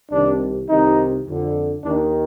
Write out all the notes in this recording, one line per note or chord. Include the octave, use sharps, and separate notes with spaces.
C2 C3 D#3 D4
C2 C3 D#3 D#4
F2 D3
D#2 D#3 D4